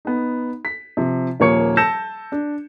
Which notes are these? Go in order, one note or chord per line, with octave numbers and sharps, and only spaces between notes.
B3 D#4
B6
C3 F3
D#1 F3 A#3 C#5 C#6 C#7
A5 E6 G6 A#6 C#7 E7
D4